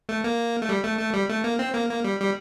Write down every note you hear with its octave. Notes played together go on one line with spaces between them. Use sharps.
A3
A#3
A3
G3
A3
A3
G3
A3
A#3
C4
A#3
A#3
G3
G3